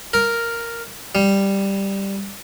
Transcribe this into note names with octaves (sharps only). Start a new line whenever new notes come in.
A#4
G3